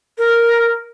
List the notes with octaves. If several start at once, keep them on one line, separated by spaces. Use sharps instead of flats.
A#4